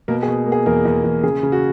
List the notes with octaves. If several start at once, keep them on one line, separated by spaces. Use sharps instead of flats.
B2 A#3 A#4
G#4
B2
A#3
G#4
E2 A#3 A#4
E2
E2
C#3 G#4
C#3
F#4